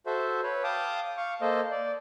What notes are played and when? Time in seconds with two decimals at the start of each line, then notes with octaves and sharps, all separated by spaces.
0.06 F#4 A4 C5 E5
0.43 B4 C#5
0.64 F5 G5 A5 D6 D#6
1.17 F5 C#6
1.41 A#3 A4 C5 D#5
1.71 D5